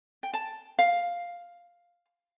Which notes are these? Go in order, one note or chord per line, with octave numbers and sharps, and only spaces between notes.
G5
A5
F5